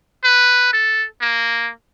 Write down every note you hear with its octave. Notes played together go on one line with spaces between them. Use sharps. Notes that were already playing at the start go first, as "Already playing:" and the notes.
B4
A4
A#3